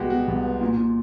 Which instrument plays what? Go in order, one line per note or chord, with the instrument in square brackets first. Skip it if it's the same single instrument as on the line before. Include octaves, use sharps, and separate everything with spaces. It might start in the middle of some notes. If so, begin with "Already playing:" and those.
Already playing: [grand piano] C2 G#3 B3 F#4 G4
B2 F#4
C2
B3
A#2
A#2